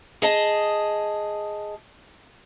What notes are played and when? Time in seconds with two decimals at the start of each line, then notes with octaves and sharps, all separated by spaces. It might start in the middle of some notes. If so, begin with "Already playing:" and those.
0.22 G#4 D#5 A5